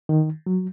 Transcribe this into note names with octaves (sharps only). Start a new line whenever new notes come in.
D#3
F#3